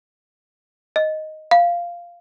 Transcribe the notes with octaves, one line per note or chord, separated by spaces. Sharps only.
D#5
F5